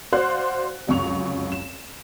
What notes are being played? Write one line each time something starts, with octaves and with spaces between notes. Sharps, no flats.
F#4 C5 D5 F5 F#5 F#6
F1 C#2 F#2 C#6 F7
E7